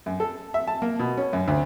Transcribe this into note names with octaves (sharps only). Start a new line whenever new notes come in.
F#2
A4
E5
A5
A#3
B2
C#4
F#2
D2